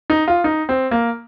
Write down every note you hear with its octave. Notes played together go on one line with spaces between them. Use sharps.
D#4
F4
D#4
C4
A#3